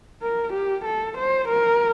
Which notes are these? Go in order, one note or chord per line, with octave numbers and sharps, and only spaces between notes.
A#4
G4
A4
C5
A#4